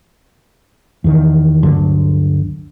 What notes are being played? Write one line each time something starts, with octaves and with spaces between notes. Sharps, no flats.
E2 D#3
G1 D2 D3 F#3